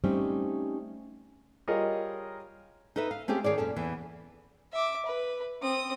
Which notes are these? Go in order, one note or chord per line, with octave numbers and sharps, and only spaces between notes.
G3 A3 C4 C#4 D#4
G3 F4 G#4 A#4 C#5 D#5
D#4 A4 B4 E5
F5
A3 C4 C#4 G4 G#4
D#3 G#4 C#5 D5
F#2 A#2 C#4 A4
E2 E3
E5 D6
B4
C4 D#6